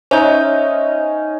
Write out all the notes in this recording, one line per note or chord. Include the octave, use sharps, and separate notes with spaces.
C#4 D#4 C5 C#5 E5